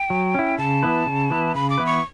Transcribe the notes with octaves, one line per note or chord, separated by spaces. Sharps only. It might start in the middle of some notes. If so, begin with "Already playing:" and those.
Already playing: G5
F#3
C#4 E4
C#3 A5
E3 B3 E4 B4
C#3
E3 B3 E4 B4
C#3 B5
D6
E3 B3 E4 B4
C#6